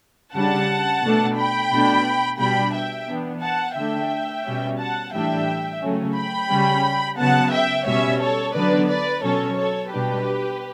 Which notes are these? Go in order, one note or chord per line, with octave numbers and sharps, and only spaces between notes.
C#3 G3 D4 F#5 A5
B2 A3 D4
G5 B5
B2 A3 D4
B2 G3 D4 G5 B5
E5 G5
E3 B3 D4
F#5 A5
D3 A3 D4 E5 G5
B2 G3 C#4
F#5 A5
A2 E3 G3 D4 E5 G5
C#3 F#3 A3 C#4
G5 B5
C#3 G3 C#4
C#3 F#3 B3 F#5 A5
E5 G5
B2 G3 C#4 C#5 E5
A4 C#5
D3 F#3 B3 D4 B4 D5
B4 D5
B2 F#3 C#4 A4 C#5
A4 C#5
B2 G3 D4 G4 B4